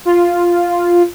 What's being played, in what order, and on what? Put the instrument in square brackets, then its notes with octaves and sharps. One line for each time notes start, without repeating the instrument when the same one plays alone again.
[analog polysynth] F4